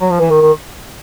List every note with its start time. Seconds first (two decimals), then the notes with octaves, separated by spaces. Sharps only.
0.01 F#3
0.11 F3
0.19 E3 B4
0.30 D#3 A#4
0.42 D#3